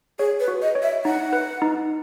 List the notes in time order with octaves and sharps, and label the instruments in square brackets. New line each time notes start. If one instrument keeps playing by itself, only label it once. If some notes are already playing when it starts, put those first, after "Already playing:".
[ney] G#4 [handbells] C#5
[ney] B4
[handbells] F#4
[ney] D#5
[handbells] C#5
[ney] E5
[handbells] D#4 [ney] F#5
[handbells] B4
D#4